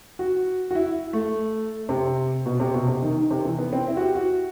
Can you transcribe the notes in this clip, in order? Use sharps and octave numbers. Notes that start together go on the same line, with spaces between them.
F#4
F#4
E4
A3
C3
B2
C3
B2
C3
D#3
D#3
C3
E3
B3
C4
E4
F#4
G4
F#4